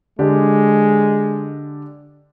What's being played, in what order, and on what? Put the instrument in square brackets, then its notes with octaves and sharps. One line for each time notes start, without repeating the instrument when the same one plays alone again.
[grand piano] D3 D4 G4 [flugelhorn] G#3